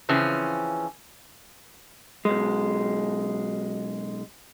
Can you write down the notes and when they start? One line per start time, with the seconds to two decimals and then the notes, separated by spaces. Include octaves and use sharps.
0.09 C#3 E3 F3 C4 C#4
2.25 B1 G#3